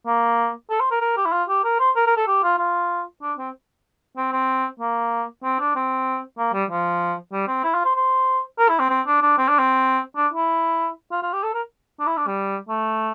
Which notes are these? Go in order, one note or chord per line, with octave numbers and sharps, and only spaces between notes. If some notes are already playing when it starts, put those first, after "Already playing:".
A#3
A4
C5
A#4
A#4
G4
E4
F4
G4
A#4
C5
A#4
A#4
A4
G4
F4
F4
D4
C4
C4
C4
A#3
C4
D4
C4
A#3
G3
F3
G3
C4
E4
F4
C5
C5
A#4
E4
C4
C4
D4
D4
C4
D4
C4
D4
E4
F4
F4
G4
A4
A#4
D4
E4
D4
G3
A3